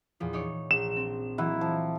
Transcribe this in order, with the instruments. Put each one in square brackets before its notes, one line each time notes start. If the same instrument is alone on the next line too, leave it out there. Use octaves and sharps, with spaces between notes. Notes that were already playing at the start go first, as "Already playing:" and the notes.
[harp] E2 A#2 F3
D#4 C#5 D5
[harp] A#1 [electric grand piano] E7
[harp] C4
[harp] E3 F#3 A#3 [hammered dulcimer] E4 F#5
[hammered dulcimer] F3